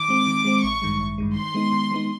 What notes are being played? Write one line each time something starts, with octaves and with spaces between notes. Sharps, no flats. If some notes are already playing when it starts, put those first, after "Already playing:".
Already playing: D#3 D6
G#3 C4
D#3
G#3 C4
A1 C#6
G2 D#3 G#3
A1
G2 D#3 G#3
D#3 C6
G#3 B3 D#4
D#3
G#3 B3 D#4